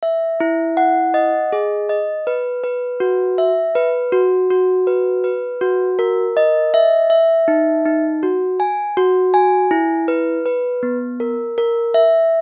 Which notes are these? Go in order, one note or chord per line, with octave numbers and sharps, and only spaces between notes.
E5
E4
F#5
D#5
G#4
D#5
B4
B4
F#4
E5
B4
F#4
F#4
B4
B4
F#4
A#4
D#5
E5
E5
D#4
D#4
F#4
G#5
F#4
G#5
E4
B4
B4
B3
A#4
A#4
E5